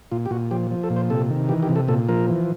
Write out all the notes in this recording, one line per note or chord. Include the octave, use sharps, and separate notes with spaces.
A#2 F4
G4
A#2 F#4
F3 G4
F3
A4
A#2
C5
C3 A4
D#3
E3 G4
G4
C3
A4
A#2 A4
F3 A#4
E3